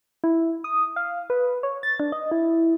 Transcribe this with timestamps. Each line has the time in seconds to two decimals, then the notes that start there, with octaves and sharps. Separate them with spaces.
0.24 E4
0.64 D#6
0.96 F5
1.30 B4
1.63 C#5
1.83 A6
2.00 D4
2.12 D#5
2.32 E4